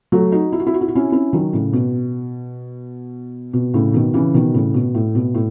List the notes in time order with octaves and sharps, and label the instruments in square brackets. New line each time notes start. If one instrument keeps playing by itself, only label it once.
[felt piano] F#3 A3
D#4 F#4
E4
F#4
E4
F#4
E4
F#4
C#4 E4
C#4 E4
D#3 F#3
A2 C#3
B2
B2
A2 C#3
B2 D#3
C#3 E3
B2 D#3
A2 C#3
B2
A2
B2
A2